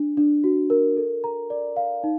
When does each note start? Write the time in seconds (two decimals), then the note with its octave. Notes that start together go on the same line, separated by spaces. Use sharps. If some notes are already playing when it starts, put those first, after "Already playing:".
Already playing: D4
0.17 D4
0.44 F#4
0.70 A#4
0.97 A4
1.24 A#5
1.50 D5
1.76 F5
2.04 D#4